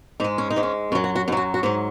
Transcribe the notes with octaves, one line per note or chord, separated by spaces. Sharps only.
G#2 G#3 D#4
C#4
D#4
G#2 G#3
C#4
F#2 F#3 C#4
F#4
F#4
F#2 F#3 D#4 F#4
F#4
G#2 F#3 D#4